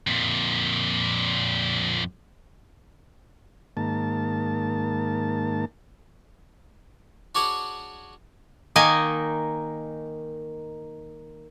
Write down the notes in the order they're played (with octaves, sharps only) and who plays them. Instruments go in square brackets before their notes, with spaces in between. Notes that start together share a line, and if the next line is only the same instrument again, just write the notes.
[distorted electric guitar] F2 A#2
[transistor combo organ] G#2 D#3 A#3 A5
[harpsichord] D4 F#4 G#4 C#5 D5 F#5
[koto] D#3 A#3 D#4 G#5